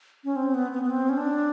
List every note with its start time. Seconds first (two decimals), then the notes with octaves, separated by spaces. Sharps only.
0.24 C#4
0.36 C4
0.54 B3
0.72 B3
0.83 B3
0.90 C4
1.09 C#4
1.17 D4